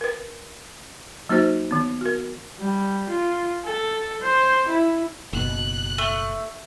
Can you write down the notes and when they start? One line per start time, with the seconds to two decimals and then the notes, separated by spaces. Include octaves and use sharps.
0.01 A#4 B4
1.29 F#3 A#3 D#4 F#4 C5
1.71 D#3 B3
2.01 F#4 A#4
2.59 G3
3.09 F4
3.64 A4
4.21 C5
4.68 E4
5.33 F#1 B2 F#6
5.98 A3